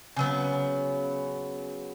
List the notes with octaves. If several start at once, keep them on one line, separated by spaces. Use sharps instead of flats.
C#3 F#3 B3